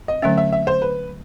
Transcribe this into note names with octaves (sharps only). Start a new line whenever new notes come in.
D#5
D3 F#3 A3 C#4 E5
E5
E5
C5
B4